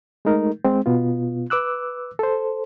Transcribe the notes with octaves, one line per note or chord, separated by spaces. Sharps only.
G#3 A3 D#4 A#4
G#3 C4
B2 B3 F4
B4 D6 E6 F#6
A4 C5